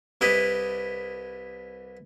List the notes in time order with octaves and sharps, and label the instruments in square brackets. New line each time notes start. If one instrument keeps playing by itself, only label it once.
[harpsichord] C2 E4 G4 B4 D#5